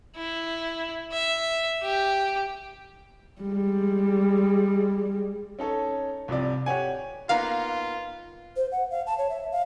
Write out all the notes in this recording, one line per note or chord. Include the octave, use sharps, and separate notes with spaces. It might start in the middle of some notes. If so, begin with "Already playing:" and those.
E4
E5
G4
G3 G#3
C#4 D#4 A4 C#5
C2 C3 F3 D5
G4 C#5 F#5 G#5
A#3 B3 D#4 F4 F5
C5
F#5
F5
A5
C#5
E5
F5